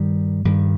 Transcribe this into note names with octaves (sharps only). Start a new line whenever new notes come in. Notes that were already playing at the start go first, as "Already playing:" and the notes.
Already playing: G2 D#3 G3
G2 D#3 G3